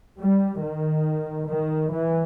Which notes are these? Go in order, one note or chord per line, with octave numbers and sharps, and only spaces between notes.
G3
D#3
D#3
E3